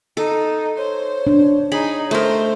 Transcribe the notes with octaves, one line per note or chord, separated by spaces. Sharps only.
D#4 A4
C5 C#5
D4
D#4 G#4 B5
A3 A#4 C5